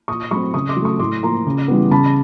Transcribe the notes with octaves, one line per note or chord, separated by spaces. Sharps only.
A#2 C#6 D#6
F#3 A3 C4 B5 C#6
C#3 C#6 D#6
C6 D6
F#3
A3 C#6 D#6
A2 C6 D6
F3 A#3 A#5 C6
C#3
E3 G3 B3
C#3 A5 B5